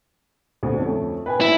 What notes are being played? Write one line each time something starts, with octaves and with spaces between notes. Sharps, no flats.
D2 C4
F2 A3 C#4
B4 G5 G#5
E4